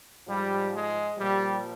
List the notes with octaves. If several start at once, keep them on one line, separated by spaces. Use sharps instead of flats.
G#2 F3 G3
G#3
A#2 F3 G3